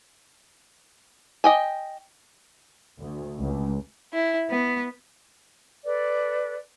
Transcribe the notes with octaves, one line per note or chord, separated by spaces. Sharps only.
D#5 G5 G#5
D2
C#2
E4
B3
A4 B4 D5